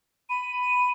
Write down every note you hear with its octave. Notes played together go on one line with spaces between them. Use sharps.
B5 D#7
D#7